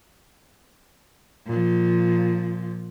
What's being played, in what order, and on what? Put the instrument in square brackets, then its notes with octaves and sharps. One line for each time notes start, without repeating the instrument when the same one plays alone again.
[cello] A#2 F3